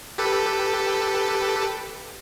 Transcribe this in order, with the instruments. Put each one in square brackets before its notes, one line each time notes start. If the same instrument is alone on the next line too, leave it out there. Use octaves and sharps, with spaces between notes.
[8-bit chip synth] G4 A4 B4